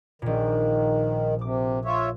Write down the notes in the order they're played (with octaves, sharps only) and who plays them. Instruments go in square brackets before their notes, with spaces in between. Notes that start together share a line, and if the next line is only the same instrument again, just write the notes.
[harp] A#1 A#2 [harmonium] D#3
[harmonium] C3 [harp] D6
[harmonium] F4 C#5 E5